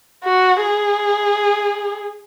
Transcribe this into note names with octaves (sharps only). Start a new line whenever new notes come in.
F#4
G#4